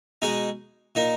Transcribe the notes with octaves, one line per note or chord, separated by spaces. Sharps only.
B2 G#3 D#4 G#4
A#2 A#3 D#4